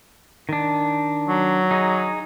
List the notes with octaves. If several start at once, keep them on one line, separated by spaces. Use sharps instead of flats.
D#3 D4
F#3
D#4 G#4